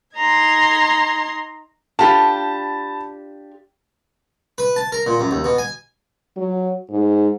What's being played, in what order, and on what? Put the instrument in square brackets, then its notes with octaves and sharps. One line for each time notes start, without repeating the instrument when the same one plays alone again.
[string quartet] D#4 A#5 C6 G#6
[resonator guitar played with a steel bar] D4 F4 G4 [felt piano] A5 B5
[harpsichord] B4
A5
A#4
A#2
F#2
D#2
B2
G#5
[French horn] F#3
G#2